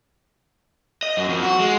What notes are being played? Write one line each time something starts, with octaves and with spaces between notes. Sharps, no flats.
D#5
F#2
F2
F#4
G#3